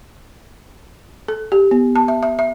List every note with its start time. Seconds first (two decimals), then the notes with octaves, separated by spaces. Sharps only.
1.28 A4
1.52 G4
1.71 B3
1.95 A5
2.08 E5
2.23 E5
2.39 E5